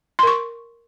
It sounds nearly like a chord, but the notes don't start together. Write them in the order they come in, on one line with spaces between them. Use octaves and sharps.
C6 A#4 C#6